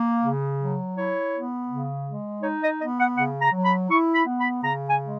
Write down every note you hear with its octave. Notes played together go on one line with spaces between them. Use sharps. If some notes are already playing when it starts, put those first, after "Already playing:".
Already playing: A#3
C#3
F#3
E4 C#5
B3
C#3
G#3
D#4 C#5
D#5
B3 D#5
F#5
C#3 F#5
A#5
F#3
B5
E4 C#6
B5
B3
B5
C#3 A#5
G#5
G#3